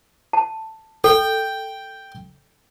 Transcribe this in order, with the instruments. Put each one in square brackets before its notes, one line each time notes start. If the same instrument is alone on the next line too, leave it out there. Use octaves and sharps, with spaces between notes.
[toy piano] A5
[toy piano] A4 [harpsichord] G5